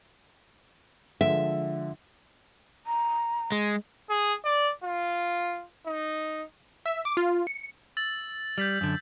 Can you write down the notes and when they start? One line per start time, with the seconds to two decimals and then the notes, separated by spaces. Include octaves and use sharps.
1.21 D3 F3 G#3 E5
2.87 A#5
3.52 G#3
4.10 G#4
4.44 D5
4.84 F4
5.87 D#4
6.86 E5
7.05 D6
7.17 F4
7.47 C#7
7.97 E6 A6 F#7
8.58 G3 G6 B6 F#7
8.81 F#2 D3